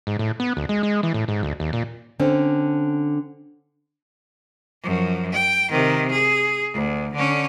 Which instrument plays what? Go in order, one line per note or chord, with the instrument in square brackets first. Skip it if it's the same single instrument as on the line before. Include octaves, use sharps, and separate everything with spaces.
[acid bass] G#2
A2
B3
D2
G#3
G#3
E3
A2
G#2
D2
D#2
A#2
[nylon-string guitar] D3 C4 C#4
[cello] F#2 F3
G5
C3 D#3
G#4
D2
D3 C#4